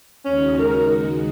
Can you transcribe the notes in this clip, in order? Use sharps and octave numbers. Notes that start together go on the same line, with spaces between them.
D#2 C#3 G#3 C#4 D#4 F#4
A#4